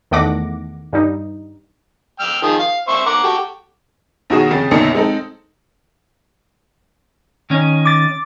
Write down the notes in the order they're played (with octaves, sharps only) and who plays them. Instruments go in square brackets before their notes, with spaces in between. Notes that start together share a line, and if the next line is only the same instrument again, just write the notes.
[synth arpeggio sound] E2 D#3 A3 F#5 D6 A#6
G2 G3 D#4
[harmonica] G5 E6 F6
D#3 F3 G#4
F5
C5 E5 C#6
A#4 F#5 D6
F#4 G4 A4
[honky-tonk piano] B1 D#3 F#4 G#4 D#6 E7
F2 C#3 A6
B1 F#2 A#2 D3 D#4 C#7
G#3 C4 D#4 A4
[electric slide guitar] D#3 C#4
[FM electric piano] D6 A6